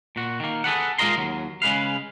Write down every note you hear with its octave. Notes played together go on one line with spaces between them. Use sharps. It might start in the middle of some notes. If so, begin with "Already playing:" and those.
A#2 F#4
D#3 A#3
G#4 A4 B4 F#5
G#3 F4 A#4 D#5 A#5 C6
D#2 F#3
C#3 G#3 B4 F5